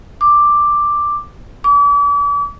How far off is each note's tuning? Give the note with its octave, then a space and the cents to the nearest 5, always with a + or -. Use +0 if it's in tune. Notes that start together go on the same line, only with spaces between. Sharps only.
D6 +5
D6 -40